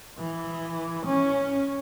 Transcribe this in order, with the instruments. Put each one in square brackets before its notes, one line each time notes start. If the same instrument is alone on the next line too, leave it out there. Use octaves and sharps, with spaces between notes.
[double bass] E3
C#4